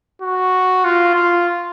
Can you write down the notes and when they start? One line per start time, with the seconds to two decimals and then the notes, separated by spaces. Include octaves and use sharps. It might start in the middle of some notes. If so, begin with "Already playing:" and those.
0.22 F#4
0.85 F4
1.15 F4